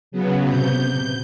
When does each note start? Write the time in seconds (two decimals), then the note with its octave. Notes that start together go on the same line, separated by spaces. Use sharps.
0.12 C#3 F#3 B3
0.48 C3 G6